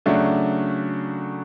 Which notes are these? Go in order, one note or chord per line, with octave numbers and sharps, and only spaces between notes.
C#3 F#3 A3 D4 F#4